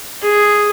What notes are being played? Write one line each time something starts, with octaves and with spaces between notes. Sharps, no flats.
G#4